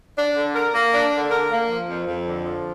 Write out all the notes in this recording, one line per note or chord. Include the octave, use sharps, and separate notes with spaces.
D4
D3
A#4
A#3
D4
D3
A#4
A#3
F3
F2
F2
D3
F3